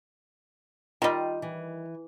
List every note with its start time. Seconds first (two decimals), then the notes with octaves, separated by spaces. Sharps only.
1.02 D#3 G3 F4 D#5
1.42 E3